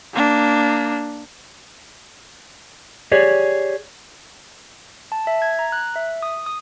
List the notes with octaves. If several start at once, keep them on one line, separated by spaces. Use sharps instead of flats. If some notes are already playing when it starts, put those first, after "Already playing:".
A#3 D4
G4 G#4 C#5 D5
A5
E5
G#6
A#5
F#6
E5
D#6
D#6